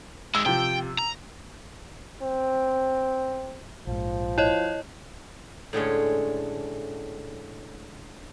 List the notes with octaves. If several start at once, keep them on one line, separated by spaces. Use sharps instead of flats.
D#3 G#3 E6
C3 F3 G5
A#5
C4
A#1 G#2 F3
E4 C#5 D#5
A2 D3 G#3 C#4